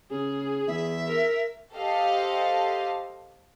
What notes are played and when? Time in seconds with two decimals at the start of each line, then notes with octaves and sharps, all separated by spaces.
0.11 C#3 G#4
0.68 E2 E5
1.07 A#4
1.74 G4 A4 C5 D#5 F5